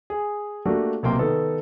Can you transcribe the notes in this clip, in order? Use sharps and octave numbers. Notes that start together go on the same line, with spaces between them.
G#4
A3 A#3 D4 F#4 G4
B1 C3 A#3 G5 C6
D#3 B3 D#4 A4